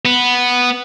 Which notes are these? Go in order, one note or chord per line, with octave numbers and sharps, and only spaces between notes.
B3